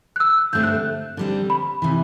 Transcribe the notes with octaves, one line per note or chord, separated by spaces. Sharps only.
F#6
E6
G2 D3 A3 C4 G6
F#6
D3 G3 C4
B5
C3 E3